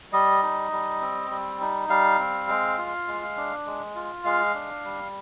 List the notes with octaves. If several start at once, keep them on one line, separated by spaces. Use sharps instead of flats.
G3 D#5
D#4
G3
C4
G3
D#4
G3 F5
C4
G#3
F4
G#3
D4
G#3
F4
G#3 F5
D4
G3